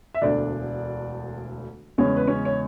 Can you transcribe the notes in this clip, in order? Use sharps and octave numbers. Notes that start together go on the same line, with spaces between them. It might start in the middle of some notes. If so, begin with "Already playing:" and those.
E5
E1 D2 D3 D4 D5
E2 C#3 G#3 C#4 C#5
B4
C#4 C#5
C#5